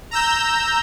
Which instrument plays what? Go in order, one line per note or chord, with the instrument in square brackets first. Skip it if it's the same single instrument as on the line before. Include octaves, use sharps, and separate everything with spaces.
[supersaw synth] A#5 E6 G6